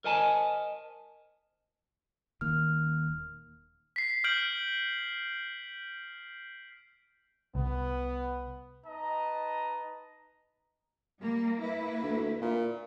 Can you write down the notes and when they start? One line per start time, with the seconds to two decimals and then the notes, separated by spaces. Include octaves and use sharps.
0.04 A#4 C5 D#5 G#5 A5
2.41 D#1 D#3 A#3 F6
3.96 B6 C7
4.24 F6 G6 D7 F#7
7.55 C2 B3
8.86 D#4 B4 D#5 A5 A#5
11.21 G3 A#3
11.60 A#3 E4 B4
12.03 D2
12.42 A#2